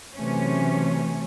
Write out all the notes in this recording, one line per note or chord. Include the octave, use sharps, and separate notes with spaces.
C3 E3 F#3 A3 C#4